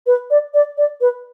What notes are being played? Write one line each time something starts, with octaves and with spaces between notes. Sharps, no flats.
B4
D5
D5
D5
B4